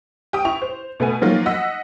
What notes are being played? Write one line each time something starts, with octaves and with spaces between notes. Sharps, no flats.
G4 G5 D#6
E4 C#6 F7
C5
B2 A3 B3 G#5
D#3 F3 F#3 A#3 F4
D#5 F#5 E6 B6